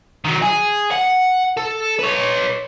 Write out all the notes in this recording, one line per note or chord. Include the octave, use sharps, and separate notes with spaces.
D#3 F#3
G#4
F#5
A4
B4 C#5